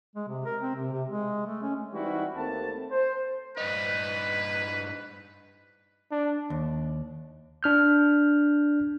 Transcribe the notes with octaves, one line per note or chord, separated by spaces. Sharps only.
G#3
C3
A#4
C4
C3
C3
G#3
A3
C#4
E3 G3 C4 D#4 E4 F#4
D#2 A3 A#3 C4 A5
C5
G2 D#4 B4
D4
D#2
D4 F6 G6